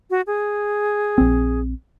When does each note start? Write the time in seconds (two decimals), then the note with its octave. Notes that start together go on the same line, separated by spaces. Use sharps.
0.10 F#4
0.27 G#4
1.18 A#1 C4